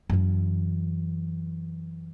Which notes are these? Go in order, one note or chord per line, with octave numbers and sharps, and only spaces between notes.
F#2 E3